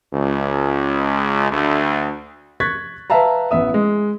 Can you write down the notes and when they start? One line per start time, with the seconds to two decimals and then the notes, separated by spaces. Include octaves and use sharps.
0.14 C#2
1.51 D2
2.60 C#6 F#6 G#6 A6 B6
3.10 B4 E5 F5 A5 A#5
3.51 A1 B3 E5 D#6
3.74 G#3